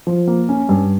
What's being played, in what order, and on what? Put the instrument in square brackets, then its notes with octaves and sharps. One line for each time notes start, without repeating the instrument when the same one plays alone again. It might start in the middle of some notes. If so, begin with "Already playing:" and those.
[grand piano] F3
A#3
C#4
G2